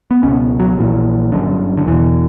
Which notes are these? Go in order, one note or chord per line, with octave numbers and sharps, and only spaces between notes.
B3
C#2 B2 C#4
F#3
A#1 A#2 E3
G1 F#2 D3
D3
E1 E2 B2 E3